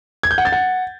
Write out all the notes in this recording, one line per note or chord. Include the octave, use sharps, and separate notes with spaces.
G#6
G6
F#5
A6
F#5